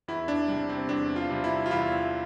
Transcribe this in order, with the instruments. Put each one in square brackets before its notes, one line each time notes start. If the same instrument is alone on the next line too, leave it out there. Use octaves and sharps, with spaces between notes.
[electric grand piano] E2 E4
D4
C3 G3
C4
E2 D4
F4
C3 G3
E4
F4
E2 E4